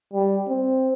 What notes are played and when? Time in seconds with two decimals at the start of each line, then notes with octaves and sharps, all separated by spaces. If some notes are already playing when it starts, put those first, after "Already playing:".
0.13 G3
0.48 C4